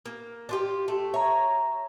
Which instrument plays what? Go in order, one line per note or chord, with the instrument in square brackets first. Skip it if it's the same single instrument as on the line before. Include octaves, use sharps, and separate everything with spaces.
[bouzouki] A#3
D4 F4 G4
A3
[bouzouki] C#5 [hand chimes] E5 A#5